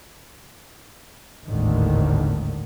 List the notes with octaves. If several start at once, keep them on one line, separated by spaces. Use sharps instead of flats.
G#1 D#2 A2 D3 D#3